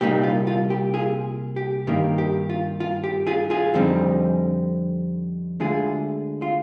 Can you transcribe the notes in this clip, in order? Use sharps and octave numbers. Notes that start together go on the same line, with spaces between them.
C2 A#2 G3 A#3 D#4 G4
F4
F4
G4
F4 G#4
G4
G2 D#3 A#3 D#4 G4
G4
F4
F4
G4
F4 G#4
F4 G#4
F2 D3 G3 C4 D#4
D2 D3 G#3 F4 G#4
F4